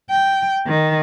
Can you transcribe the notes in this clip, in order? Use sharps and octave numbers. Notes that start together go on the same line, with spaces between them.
G5
D#3